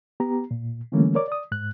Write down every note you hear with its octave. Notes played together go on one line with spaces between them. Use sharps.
B3 G4 A#5
A#2
D3 E3 G3 A3 A#3 C#4
A#4 C#5 D5 D6
D5 D#6
G#2 F#6